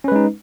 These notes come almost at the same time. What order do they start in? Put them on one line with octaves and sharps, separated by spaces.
C#4 B4 G#3 D#4